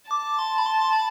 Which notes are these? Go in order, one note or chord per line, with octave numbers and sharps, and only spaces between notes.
A5 D6
C6
B5
C6
C6
B5